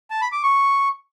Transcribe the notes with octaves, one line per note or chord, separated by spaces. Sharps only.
A5
B5
D6
C#6